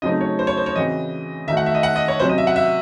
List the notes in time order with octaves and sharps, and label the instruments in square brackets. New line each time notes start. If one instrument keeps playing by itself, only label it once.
[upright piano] C#3 F#3 A3 C4 D#4 [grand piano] D#5
[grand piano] C#5
C5
C#5
C5
C#5
[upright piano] C#3 E3 C4 F#4 [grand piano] D#5
[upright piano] D#3 A3 D#4 F#4 [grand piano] E5
[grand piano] F#5
E5
D#5
F#5
D#5
C#5
[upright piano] C3 F#3 C#4 [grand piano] C5
[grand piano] D#5
E5
F#5
E5